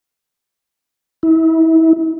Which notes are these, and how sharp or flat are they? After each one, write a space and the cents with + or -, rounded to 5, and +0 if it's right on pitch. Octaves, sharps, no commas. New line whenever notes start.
E4 -35